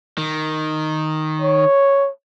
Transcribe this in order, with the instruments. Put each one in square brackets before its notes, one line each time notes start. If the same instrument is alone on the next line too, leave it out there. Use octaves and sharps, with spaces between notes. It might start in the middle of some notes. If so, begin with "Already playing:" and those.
[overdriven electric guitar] D#3
[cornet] C#5